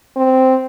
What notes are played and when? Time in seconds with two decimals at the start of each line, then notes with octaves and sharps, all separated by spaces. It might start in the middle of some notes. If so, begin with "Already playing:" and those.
0.17 C4